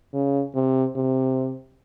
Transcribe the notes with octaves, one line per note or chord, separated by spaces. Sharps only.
C#3
C3
C3